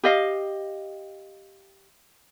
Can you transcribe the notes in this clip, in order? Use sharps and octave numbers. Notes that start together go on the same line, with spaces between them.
G4 D#5 F5